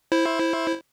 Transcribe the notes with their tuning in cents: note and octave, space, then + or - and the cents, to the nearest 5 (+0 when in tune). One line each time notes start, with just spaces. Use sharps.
E4 +0 C5 +15